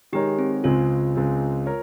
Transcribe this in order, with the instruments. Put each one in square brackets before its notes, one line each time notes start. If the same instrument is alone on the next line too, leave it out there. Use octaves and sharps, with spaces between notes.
[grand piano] D#3 G#3 D#4 A#4 C#5 [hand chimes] G4
[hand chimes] C4
[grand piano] C#2 C#3 G#3 C4 [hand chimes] F4
[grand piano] C#2 C#3 G#3 C4
A#4 C#5